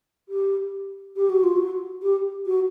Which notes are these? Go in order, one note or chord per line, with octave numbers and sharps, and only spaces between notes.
G4
G4
F#4
F4
F#4
G4
F#4